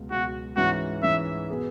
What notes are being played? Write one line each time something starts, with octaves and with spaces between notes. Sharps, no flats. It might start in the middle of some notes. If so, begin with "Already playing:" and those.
Already playing: C#2 B2 F#3
C#2 B2 F#3 F#4
G#2 E3 C#4 F#4
G#2 E3 C#4 E5
B2 B3 G#4